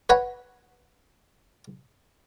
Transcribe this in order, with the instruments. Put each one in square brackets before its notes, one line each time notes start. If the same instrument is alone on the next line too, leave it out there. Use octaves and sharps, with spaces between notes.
[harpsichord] B4 C#5 F#5 A#5